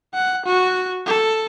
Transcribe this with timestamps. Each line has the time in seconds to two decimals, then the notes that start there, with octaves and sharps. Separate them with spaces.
0.14 F#5
0.46 F#4
1.06 A4